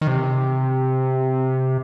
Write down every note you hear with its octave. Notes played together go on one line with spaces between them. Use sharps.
D#3
C3